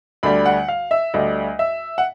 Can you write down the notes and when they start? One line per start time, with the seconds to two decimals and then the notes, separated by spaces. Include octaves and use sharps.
0.23 D2 D3 G3 B5
0.46 F#5
0.68 F5
0.91 E5
1.14 D2 D3 G3 D#5
1.59 E5
1.98 F#5